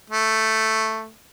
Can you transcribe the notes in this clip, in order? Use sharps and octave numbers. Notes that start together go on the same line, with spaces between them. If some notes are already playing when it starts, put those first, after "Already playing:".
A3